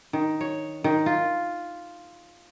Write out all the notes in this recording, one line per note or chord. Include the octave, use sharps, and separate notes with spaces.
D#3
C#5
D#3
F4